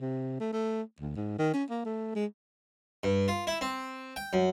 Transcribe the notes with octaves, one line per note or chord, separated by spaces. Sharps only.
C3
A3
A3
D2
G#2
D#3
C#4
A#3
A3
G#3
G2
F4
E4
C4
G5
F#2